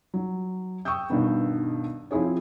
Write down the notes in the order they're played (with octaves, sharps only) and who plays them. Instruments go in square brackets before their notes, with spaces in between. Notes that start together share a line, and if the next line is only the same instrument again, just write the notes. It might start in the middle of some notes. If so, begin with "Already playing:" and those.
[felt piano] F#3
G5 C#6 D#6 E6 G6
G2 B2 D#3 B3
F3 C4 E4 G#4 C#5